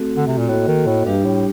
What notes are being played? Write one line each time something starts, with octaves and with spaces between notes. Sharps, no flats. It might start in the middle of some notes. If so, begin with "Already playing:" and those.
Already playing: A3 C4 F#4 A4
D3
C3
A#2
A2 A#3 F#4 A4 D#5
D#3
A2
G2 G3 D4 G4
A2